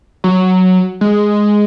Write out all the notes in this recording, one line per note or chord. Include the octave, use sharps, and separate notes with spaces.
F#3
G#3